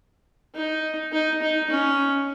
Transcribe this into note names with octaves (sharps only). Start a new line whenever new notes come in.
D#4
D#4
D#4
C#4